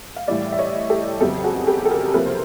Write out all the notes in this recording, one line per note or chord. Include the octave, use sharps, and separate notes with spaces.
F5
A2 E3 G3 D5 E5
E5
C#5 D#5
G4 A4
F2 C#3 F#3 B3 G4 A4
F#4 G#4
G4 A4
A4
G#4 A#4
C2 C3 F3 A#3 A4 B4
C5